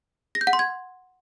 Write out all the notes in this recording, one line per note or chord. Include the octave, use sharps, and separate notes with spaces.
A#6
G6
F#5
C6
G#6